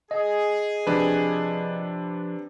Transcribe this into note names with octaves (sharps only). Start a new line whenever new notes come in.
G#4 D#5
C3 F3 D4 B4